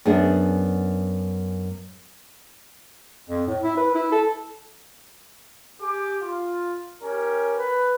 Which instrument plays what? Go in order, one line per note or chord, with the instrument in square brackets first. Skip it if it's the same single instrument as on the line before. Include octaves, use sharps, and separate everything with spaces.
[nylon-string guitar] F#2 B3 D4 G#4
[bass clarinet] F2
A2
E4
B4
E4
A4
[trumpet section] G4 G#4 D6
F4
C#4 G4 A#4
[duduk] B4